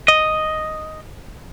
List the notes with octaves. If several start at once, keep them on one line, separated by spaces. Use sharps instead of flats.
D#5